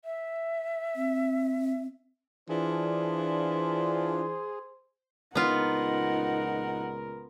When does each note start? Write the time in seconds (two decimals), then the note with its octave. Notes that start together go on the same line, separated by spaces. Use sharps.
0.05 E5
0.96 C4
2.49 E3 D4 F4 G#4 C5
5.35 C#2 A#2 B3 D#4 F4 A#4 F#5